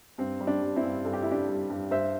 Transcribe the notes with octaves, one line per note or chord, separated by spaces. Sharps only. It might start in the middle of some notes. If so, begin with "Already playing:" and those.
G2 C4
G3
D4
G3
C4 E4
G2
G2 A4
G4
G3 E4
D4 G4
G3
G2
G2 C5 E5